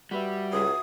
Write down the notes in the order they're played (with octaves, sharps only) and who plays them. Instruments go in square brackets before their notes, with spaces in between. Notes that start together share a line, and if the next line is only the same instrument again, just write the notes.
[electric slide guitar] G3 [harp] F#4 B4 E5
[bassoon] C#2 [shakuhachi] D#6